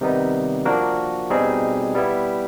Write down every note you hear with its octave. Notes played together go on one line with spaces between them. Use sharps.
C3 D#3 G3 B3 D#4
F3 A#3 D4 F#4 A#4
B2 G3 C4 D#4 G#4
G3 B3 E4